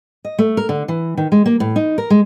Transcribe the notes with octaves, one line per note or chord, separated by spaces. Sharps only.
D#5
A3
A#4
D3
E3
D#3
G#3
A#3
A2
D#4
A#4
G#3